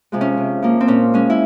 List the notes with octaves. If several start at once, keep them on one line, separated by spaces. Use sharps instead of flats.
C3 F3 G#3
C#4
C3
F3 A#3
C4
A#2 C#4
G#3 C#4
E4